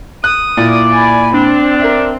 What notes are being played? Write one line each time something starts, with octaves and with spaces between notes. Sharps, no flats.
D#6 F#6
A#2 E4 D5
G#5 B5
C4 D4
A#4 E5